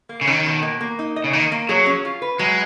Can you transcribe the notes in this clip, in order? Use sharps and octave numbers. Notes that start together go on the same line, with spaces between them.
A#3
C#3
D#3 C#4
B2
A#3
A#3
D#4
D#5
C#3
D#3 A#3
A#3
F#3 G#4
C#4
F4
B4
F#3 G#3